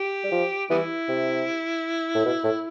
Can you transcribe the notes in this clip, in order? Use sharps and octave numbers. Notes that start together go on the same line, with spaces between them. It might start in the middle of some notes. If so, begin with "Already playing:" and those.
Already playing: G4
G3
F3
E3 G3 B3 E4
C3
A2
B2
A2